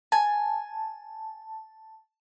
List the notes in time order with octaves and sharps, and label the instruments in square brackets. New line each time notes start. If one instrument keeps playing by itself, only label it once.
[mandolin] G#5 [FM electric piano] A5